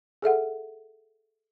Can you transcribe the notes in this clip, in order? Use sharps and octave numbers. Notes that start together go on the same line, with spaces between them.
G#4 A4 E5 F#5